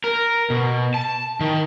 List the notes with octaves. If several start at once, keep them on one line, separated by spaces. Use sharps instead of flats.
A#4
B2
A5
D#3